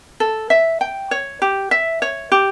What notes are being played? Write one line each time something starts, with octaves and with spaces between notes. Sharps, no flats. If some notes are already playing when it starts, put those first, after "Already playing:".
A4
E5
G5
C#5
G4
E5
C#5
G4